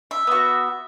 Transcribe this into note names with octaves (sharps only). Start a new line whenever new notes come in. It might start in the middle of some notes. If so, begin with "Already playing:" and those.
E5
B3 F#4